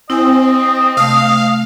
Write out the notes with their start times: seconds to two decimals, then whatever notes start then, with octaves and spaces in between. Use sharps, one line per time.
0.10 C4 E4 D#5 G#5
0.97 C3 A3 F5